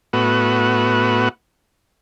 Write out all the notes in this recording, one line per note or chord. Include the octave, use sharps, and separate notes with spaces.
A2 B3 F#4